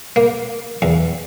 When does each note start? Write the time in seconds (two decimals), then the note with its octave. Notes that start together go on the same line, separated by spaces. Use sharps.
0.16 A#3
0.82 E2